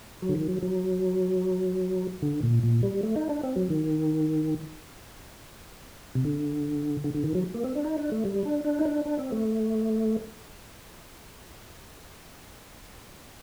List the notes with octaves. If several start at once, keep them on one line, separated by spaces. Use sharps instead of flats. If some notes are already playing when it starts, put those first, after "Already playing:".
F#3
D3
D#3
F#3
F#3
D3
A#2
A#2
G3
A3
D#4
D4
C4
F#3
D#3
C3
D3
D3
D3
D#3
F#3
A#3
C4
D4
D#4
D4
A3
G3
D4
D4
D#4
D4
D4
C4
A3